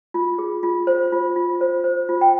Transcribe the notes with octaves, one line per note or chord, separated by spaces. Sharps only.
F4
G#4
F4
C5
F4
F4
C5
C5
F4
G5